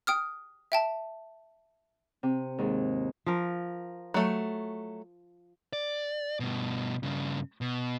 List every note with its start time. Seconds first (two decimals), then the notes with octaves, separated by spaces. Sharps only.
0.07 G5 D#6 F6
0.72 E5 G5 A5
2.23 C3
2.58 D#2 G#2
3.26 F3 A#4
4.14 F#3 A3
5.73 D5
6.40 G2 B2
7.03 G2 C#3
7.61 B2